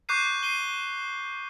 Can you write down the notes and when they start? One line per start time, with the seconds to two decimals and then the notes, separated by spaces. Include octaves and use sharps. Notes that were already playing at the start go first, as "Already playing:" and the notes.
0.09 C#6 D6 F#6 G6 C7 D#7
0.43 C7 D#7 G7